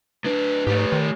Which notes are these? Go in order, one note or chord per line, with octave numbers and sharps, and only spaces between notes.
A2 D4 B4
G#2 A3 G4
D#3